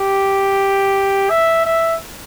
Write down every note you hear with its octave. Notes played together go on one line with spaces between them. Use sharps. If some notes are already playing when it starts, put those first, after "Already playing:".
Already playing: G4
E5
E5